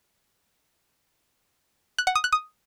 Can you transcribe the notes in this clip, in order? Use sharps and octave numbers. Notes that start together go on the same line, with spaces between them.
F#6
F#5
D#6
F#6
D#6